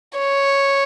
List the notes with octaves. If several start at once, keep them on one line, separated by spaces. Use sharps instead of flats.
C#5